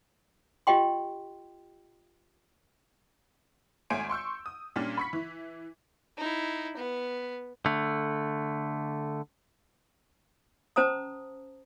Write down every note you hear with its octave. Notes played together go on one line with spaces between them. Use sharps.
F4 G4 D#5 G5 C6
G#1 A3 C#5 G#5 C6 D7
C6 C#6 E6 G6
D#6
A#2 G3 C#4 D4
B5 C#6 B6
E3
D#4 E4
B3
D3 A3
C#4 C5 A5 A#5 D#6